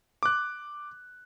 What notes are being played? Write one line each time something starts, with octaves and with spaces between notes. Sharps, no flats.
D6 F#6